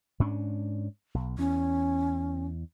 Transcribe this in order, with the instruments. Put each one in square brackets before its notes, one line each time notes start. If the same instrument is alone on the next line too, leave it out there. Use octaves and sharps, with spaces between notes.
[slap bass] G#2 C#4 D4
B1
[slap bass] E2 [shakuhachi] C#4